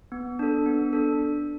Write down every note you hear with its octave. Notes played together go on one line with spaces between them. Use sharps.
B3
D4 A4
B3
D4 A4